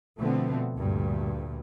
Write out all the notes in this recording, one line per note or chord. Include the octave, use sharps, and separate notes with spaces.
B2 D3 F3 A3 B3 C4
D2 G2 A#2